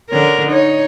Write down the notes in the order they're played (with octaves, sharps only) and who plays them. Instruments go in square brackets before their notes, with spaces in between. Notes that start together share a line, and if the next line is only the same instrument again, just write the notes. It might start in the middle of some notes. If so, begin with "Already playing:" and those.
[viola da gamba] D3 C#4 A#4
D#4 C#5